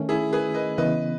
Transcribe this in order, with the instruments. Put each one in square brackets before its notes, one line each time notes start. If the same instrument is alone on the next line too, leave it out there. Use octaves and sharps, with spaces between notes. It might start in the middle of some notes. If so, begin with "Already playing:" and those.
Already playing: [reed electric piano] D#3 A3 C#4
[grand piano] E4 G#4
G#4 B4
B4 D#5
[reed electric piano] C#3 E3 B3 [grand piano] B4 D#5